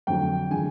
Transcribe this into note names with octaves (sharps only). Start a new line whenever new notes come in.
F2 D3 F#3 G5
D3 F3 G#3 G#5